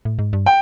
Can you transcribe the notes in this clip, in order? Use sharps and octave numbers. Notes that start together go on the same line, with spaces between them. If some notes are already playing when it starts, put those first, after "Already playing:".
A2
G#2
G2
G5